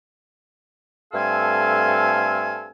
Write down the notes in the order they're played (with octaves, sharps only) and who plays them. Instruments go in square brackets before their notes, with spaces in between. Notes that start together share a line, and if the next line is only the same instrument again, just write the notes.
[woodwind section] G2 A3 C4 A4 F5 G#5